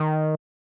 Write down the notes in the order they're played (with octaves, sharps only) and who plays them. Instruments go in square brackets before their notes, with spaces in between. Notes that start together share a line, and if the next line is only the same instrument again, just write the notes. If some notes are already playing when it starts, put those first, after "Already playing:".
Already playing: [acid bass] D#3